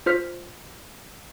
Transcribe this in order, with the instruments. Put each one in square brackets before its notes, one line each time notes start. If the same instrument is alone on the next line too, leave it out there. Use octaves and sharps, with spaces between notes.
[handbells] F4 C5 F6 B6